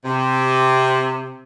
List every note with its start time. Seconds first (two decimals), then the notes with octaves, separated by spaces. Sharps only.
0.05 C3